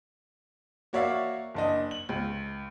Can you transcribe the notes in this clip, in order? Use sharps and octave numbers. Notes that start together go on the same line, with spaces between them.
A#3 F#4 C#5 D5 E5 F5
F#1 D4 D#5
F#7
C#2